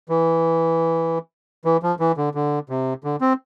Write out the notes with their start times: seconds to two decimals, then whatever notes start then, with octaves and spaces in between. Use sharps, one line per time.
0.09 E3
1.65 E3
1.83 F3
2.00 E3
2.17 D3
2.35 D3
2.69 C3
3.04 D3
3.21 C4